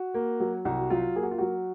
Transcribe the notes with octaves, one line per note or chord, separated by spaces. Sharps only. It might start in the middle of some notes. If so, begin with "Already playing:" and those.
Already playing: F#4
A#3
F#3
C2 F#4
F#3 F4
A#3 G#4
F#4
F4
F#3 F#4